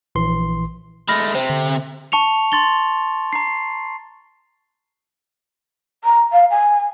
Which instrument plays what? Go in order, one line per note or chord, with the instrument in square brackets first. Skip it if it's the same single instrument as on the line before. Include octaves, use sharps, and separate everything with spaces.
[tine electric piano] A#1 E3 C6
[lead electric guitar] G#3 A3 [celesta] B5 F6 A#6
[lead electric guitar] C3 [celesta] C5
[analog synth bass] D3
[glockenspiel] A5 C#6 C#7 F7
C6 A6 G7
A#5 C7
[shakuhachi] A#5
F5
G#5